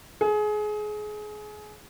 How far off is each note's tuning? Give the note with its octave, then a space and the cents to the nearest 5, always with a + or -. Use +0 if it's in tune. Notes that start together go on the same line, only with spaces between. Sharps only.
G#4 +25